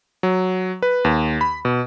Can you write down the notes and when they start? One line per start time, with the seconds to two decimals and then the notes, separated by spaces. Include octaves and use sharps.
0.23 F#3
0.82 B4
1.05 D#2
1.41 B5
1.65 B2